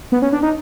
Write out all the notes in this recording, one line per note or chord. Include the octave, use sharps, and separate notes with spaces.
B3
C#4
D4
D#4